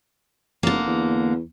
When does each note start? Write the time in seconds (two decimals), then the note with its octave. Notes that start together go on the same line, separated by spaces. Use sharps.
0.63 F1 D3 A#3
0.86 E2